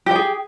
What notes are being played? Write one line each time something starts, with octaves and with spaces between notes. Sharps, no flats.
G4 G#4 G5